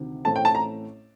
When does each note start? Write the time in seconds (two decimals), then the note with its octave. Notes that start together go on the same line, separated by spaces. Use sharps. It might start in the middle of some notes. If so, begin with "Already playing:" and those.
Already playing: D2 C3 D#3
0.25 A1 A2 A3 C4 A5
0.36 G5
0.45 A5
0.55 A#5